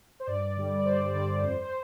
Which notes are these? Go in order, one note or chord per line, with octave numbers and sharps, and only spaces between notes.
C5
G2 D5
D3 G3
D5
G2 C5
D3 G3 D5
F2 C5
C5